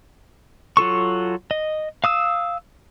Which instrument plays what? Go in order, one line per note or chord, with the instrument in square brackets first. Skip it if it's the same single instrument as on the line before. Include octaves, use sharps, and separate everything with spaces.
[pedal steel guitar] F#3 F4 A4 C#6
D#5
F5 D#6 E6